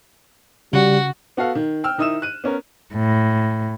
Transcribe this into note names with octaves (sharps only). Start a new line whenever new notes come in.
C#3 G3 F#4
B3 F#4 A4 F5
D#3
G5 E6 F6
D#3 D#4 E4 D#6 E6 E7
F#6 D#7
B3 C#4 A#4
A2